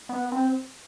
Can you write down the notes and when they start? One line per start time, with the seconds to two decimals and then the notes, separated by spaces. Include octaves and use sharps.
0.09 B3
0.32 C4